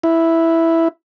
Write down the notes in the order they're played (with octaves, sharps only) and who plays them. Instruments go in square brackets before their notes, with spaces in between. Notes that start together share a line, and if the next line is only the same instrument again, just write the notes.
[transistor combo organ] E4